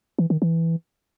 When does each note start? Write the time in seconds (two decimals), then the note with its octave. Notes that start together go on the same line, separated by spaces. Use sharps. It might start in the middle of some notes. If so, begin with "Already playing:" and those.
0.19 E3
0.30 D#3
0.42 E3